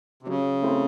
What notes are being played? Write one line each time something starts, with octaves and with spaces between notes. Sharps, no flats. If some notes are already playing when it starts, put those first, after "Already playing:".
C3
C#3 F#3
A3 C4 E4